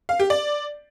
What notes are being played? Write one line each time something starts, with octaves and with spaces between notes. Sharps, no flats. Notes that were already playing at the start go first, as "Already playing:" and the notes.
F5
G4
D5